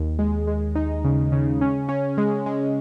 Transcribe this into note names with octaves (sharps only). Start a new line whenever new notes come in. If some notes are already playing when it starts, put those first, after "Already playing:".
Already playing: D#2
G#3
G#3
D#4
C#3
C#3
C#4
C#4
G#3
G#3